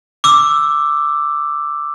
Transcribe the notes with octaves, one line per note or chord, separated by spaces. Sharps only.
D6 E6